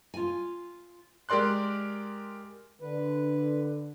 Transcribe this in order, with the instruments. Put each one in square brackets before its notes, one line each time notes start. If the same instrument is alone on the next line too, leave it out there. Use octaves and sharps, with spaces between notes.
[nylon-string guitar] F4 G#5
[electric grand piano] G#3 G4 A#4 D5 C6 F#6
[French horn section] D3 [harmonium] B4